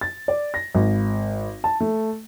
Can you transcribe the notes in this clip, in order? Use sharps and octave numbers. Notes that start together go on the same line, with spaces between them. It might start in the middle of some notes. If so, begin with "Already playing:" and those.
A6
D5
A#6
G#1
A5
A3